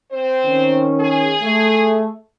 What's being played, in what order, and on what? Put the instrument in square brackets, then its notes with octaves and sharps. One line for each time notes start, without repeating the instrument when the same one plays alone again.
[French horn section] C4 C5
[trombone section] D#3 C#4
[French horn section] G#4
[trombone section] A3